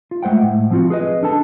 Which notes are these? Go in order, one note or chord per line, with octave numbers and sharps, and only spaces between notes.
F4
G#3 A3 C5 F#5 G5
A2
F3 C4 F4 F#4
G#4 B4 D#5
D4 A4 A5